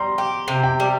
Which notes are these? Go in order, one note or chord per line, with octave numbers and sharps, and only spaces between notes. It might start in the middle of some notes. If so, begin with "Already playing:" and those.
Already playing: G3 A#5 C6
G4
C3
G5
G3